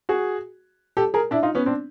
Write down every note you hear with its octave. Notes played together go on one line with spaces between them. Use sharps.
F#4 G#4
G4 A4
G#4 A#4
D4 E4
D#4 F4
B3 C#4
C4 D4